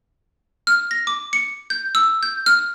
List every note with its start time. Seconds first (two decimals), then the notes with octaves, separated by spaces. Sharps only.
0.67 F6
0.91 A#6
1.07 D6
1.33 C#7
1.70 G6
1.95 E6
2.23 G6
2.46 F6